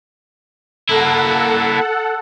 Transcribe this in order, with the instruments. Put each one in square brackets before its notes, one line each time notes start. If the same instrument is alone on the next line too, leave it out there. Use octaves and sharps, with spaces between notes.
[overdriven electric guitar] A#3 E4 [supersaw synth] A4 F#5